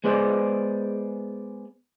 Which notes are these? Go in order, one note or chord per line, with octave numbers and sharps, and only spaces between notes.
G#3 B3 G#4 C5 D5